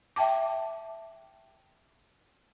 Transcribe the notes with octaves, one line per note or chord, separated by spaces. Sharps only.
E5 G5 A5 D6